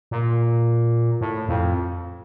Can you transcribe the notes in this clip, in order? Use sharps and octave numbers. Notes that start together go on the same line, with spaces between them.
A#2
A2
F2